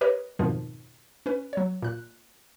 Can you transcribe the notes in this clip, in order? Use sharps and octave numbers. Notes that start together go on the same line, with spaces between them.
G4 A#4 B4 C#5 D#5
F2 G#2 B2 D#3 F3
C#4 B4
F#3 C#5
A#2 F#6